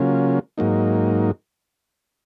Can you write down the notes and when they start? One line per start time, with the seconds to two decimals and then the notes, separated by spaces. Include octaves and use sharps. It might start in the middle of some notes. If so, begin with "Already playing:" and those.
Already playing: C#3 F#3 A#3 C#4 F4
0.58 G#2 F#3 A#3 D#4